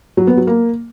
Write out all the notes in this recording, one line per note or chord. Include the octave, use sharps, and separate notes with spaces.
F#3
B3
F#3
A#3